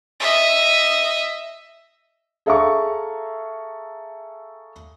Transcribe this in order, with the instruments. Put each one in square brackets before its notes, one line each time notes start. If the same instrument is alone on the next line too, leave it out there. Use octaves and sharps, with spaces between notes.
[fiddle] D#5 E5
[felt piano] G#4 A4 E5 F5 A#5 C#6